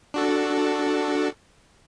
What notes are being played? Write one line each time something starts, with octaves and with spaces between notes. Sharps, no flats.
D4 F#4 A4